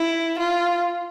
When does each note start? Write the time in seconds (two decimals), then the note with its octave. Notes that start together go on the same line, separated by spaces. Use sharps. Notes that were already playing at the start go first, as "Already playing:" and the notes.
Already playing: E4
0.39 F4